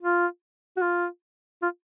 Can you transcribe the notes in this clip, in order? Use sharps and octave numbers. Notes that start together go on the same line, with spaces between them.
F4
F#4
F4
F4